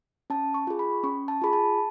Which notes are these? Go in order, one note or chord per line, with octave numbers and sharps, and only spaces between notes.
C#4 A5
C#6
F4 G#4
B5
C#4 C#6
A5
F4 G#4 B5
A5